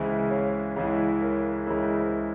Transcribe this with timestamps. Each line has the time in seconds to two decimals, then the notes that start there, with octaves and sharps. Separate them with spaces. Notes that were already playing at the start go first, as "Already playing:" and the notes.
Already playing: C#2 C#3 E3 G#3 E4 C5 E5
0.30 C#5 F5
0.76 C#2 C#3 E3 G#3 E4 C#5 F5
1.22 A#4 C#5
1.67 C#2 C#3 E3 G#3 E4 A#4 C#5
1.97 C5 E5